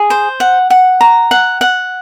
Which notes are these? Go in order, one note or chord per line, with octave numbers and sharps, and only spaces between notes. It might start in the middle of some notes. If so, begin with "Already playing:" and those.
Already playing: G#4
C5
F#5
F#5
A#5
F#5
F#5